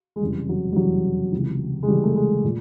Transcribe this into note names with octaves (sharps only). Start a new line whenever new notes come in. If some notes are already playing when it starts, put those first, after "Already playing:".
G#3
F1 E2 C#3 E3 G3
F#3
G3
F1 E2 C#3 E3 F#3
C#2 C3 E3
G#3
C#2 C3 E3 G3
A3
G#3
A#2